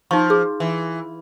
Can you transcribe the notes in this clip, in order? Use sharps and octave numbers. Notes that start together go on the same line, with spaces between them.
F3 D#4 C#6
G#4
E3